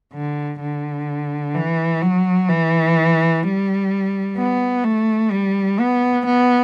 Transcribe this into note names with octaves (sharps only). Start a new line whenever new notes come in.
D3
D3
E3
F#3
E3
G3
B3
A3
G3
B3
B3